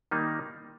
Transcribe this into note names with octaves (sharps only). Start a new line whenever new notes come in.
D#3 G3 A#3 D#4